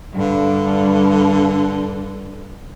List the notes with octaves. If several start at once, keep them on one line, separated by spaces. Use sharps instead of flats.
G2 D3